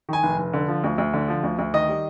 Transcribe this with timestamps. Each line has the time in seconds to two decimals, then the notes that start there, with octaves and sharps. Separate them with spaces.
0.09 D#3 G#5
0.23 F1
0.38 F1
0.53 D3
0.68 F3
0.84 D2
0.98 D2
1.13 D3
1.28 F3
1.43 D2
1.59 D2
1.74 D#3 D#5
1.89 G3